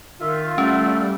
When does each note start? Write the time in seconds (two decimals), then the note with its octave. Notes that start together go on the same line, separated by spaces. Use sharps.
0.21 D#3 F4 E5
0.58 G3 A3 C#4